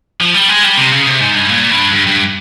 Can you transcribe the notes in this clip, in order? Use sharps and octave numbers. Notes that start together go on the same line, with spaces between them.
F3
G3
G#3
G3
C3
C#3
C3
G#2
G2
A#2
G2
G2
G2